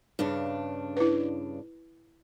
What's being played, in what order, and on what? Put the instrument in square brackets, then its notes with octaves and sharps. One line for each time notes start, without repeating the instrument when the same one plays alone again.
[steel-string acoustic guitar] G2 C#3 D4
[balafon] E4 B4